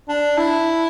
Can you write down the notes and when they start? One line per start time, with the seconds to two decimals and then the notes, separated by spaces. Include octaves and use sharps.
0.09 D4
0.37 E4